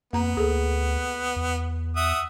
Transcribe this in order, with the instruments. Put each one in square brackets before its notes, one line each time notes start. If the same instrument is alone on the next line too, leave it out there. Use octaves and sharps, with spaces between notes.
[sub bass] F2 [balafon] A#3 A#5 [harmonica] B3
[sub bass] D2 [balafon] G#4 A4
[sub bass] E2
[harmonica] E5 F#5 D#6